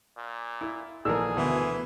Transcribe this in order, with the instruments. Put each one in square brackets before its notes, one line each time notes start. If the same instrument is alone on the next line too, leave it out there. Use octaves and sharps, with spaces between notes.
[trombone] A#2
[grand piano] E4
[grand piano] A#1 A3 E6 [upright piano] D#3 E3 A#4 [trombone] G#4
[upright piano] D2 [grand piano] B2 [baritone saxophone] E3